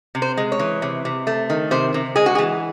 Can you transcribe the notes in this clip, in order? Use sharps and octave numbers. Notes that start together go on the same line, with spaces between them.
C3
C5
G#3
C#5
E3
C3
C3
A3
D#3
C3 C5
C3
G#3 G#4
F#4
G#4
E3